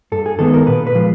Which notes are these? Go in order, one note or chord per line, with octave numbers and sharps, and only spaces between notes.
G2 A4
G#4
D#3 G#3 B3 A4
A#4
A#2 B4
B4
F3 G#3